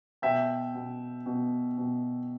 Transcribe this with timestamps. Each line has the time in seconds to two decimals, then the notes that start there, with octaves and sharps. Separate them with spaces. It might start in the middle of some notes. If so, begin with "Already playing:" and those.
0.22 B2 E5 G5
0.74 B2
1.26 B2
1.78 B2